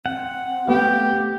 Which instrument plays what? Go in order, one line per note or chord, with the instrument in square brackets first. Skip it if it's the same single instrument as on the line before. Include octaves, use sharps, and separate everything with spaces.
[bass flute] C4 [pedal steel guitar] F#5
[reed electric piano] A3 B3 F5 [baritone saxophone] G4